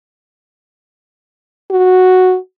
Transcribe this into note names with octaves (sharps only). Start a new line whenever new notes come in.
F#4